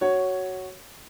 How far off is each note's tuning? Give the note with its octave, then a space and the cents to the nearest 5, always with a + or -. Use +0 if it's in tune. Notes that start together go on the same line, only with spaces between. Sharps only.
F#4 +10 C#5 +0